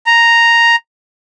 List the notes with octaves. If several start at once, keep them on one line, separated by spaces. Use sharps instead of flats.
A#5